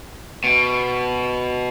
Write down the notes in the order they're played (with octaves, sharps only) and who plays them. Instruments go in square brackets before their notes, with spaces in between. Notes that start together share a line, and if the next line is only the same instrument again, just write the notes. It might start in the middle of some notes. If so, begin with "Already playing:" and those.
[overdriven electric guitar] B2